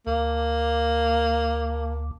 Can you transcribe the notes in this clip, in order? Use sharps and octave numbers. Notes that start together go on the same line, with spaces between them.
D2 A#3